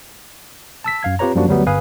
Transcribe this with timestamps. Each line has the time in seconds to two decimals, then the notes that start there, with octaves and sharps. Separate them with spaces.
0.84 A5 E6 B6
1.03 F#2 F5 G#6
1.19 C4 F4 G4 B4 C#5 A#5
1.35 F#2 F3 G3 A#3 D4 F#4
1.47 D2 F#3 G3 B3
1.67 G1 B4 F5 G#5 D#6